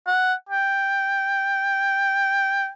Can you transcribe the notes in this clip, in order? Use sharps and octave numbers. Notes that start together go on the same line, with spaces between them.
F#5
G5